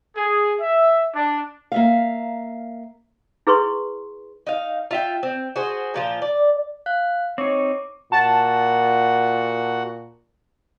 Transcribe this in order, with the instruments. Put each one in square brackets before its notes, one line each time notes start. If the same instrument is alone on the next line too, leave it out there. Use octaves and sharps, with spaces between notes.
[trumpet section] G#4
E5
D4
[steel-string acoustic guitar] A#3 E5 F5
[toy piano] E4 G#4 B4 C6 C#6
[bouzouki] D#4 F5
F4 E5 G5
C4
F#4 G#4 C5
A#2 F3 F4
D5
[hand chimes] F5 F#6
[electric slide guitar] C4 D#4 [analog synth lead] C#5 [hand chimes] D6
[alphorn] A#2 [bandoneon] F#4 F#5 [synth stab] A5